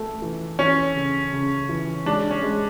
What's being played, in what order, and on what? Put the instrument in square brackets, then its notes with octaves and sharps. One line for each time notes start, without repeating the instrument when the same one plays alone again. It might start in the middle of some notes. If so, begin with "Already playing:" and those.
Already playing: [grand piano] A3
E3
[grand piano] E3 [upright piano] C#4
[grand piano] C#3
C#3
E3
[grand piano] G#3 [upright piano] D4
[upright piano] C#4
[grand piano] G#3